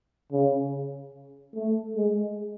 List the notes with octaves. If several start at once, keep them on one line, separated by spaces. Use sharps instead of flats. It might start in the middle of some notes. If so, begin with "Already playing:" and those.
C#3
A3
G#3